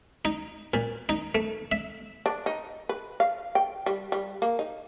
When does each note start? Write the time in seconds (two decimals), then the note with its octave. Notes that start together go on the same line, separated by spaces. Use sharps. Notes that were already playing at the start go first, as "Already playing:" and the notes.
0.25 D#4
0.74 A#2
1.09 D#4
1.35 A3
1.72 E5
2.26 D4
2.46 D#4
2.89 B4
3.20 F5
3.55 G5
3.86 G3
4.12 G3
4.42 A#3
4.59 D#4